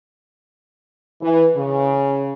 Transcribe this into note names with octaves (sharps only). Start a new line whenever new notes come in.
E3
C#3